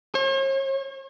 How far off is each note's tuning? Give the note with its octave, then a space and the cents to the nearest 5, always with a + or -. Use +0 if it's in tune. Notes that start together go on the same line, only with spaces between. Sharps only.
C#5 -45